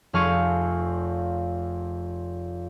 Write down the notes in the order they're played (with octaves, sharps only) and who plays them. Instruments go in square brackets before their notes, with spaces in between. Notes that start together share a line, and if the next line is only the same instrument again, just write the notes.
[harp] F1 F2 G#4 F5 C#6 D#7